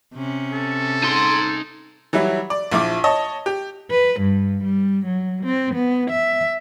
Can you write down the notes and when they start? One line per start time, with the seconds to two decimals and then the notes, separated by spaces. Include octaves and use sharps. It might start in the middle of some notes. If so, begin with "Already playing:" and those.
0.15 C3 C#4
0.53 A4
1.03 D#4 C6
2.13 E3 F#3 G3 E4
2.50 D5
2.72 A#1 F3 E4 D6
3.04 C#5 D#5 A5
3.46 G4
3.90 B4
4.20 G2
4.64 G3
5.06 F#3
5.44 C4
5.74 B3
6.11 E5